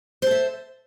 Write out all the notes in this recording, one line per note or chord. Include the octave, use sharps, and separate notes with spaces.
A4 C5 E5